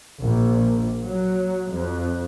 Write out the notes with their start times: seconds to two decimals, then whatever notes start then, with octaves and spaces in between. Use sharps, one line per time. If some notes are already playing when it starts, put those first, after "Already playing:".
0.23 A#1
1.06 F#3
1.72 F2